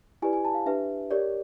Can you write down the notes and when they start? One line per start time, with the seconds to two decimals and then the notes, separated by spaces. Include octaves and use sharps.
0.22 E4 G4 B4 D5 G#5
0.33 G#5
0.45 A5
0.54 F5
0.66 D4 G4 B4 E5
1.11 G4 A#4 C#5 D5